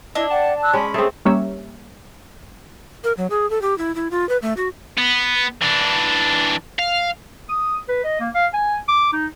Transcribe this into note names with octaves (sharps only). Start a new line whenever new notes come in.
D4 E4 D#5
D5 F#5 G5 A5
E6 F#6
G#3 C#4 B5
A3 C4 G#4
G3 A#3 C#4 G4 C#5 E5
A#4
F#3
G#4
A4
G4
E4
E4
F4
B4
A3
F#4
B3
E3 D4
F5
D#6
B4
D#5
A#3
F5
G#5
D6
D#4